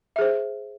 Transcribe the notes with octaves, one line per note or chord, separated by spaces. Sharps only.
G#4 C5 E5